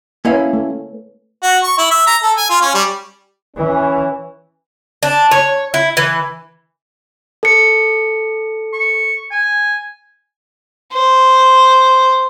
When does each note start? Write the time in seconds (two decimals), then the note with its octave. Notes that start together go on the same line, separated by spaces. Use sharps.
0.25 A#3 C#4 E4 B4 C#5 F5
0.53 A3
1.43 F#4
1.63 C#6
1.78 E4
1.91 E5
2.07 A#5
2.23 A4
2.37 G#5
2.50 F4
2.61 C#4
2.74 G3
3.56 E3 C#4
5.03 D4
5.31 C#5
5.74 E4
5.97 E3
7.43 A4 C#7
8.73 C#6
9.31 G#5
10.93 C5